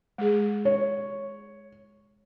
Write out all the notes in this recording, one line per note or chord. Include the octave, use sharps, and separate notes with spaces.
G#3 G#4
C#5